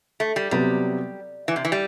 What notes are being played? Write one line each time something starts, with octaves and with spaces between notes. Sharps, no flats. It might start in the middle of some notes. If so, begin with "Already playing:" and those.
A3
G3
C3 F#3 G3 B3
E3
C3
E3
G3